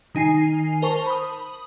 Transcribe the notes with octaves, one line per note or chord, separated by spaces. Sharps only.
D#3 D#4 G#5 C7
A#4 C5 A5 C#6
B5 D#6